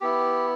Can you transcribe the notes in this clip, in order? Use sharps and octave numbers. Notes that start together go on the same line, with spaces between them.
B3 E4 G4